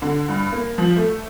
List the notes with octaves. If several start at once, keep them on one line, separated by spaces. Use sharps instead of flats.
D3
G2
A#3
F3
A3